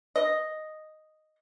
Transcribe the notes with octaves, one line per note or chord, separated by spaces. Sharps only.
D#5